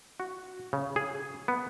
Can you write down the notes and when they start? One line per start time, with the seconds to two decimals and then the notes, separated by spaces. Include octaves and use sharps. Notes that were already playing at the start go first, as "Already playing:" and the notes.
0.20 F#4
0.73 C#3
0.96 G#4
1.48 B3